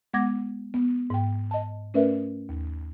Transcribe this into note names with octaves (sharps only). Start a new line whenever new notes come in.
G#3 B3 F#5 D6 G#6 A#6
B3
G#2 G5
D#5 A5
A3 C#4 A#4 B4 D5 E5
D#2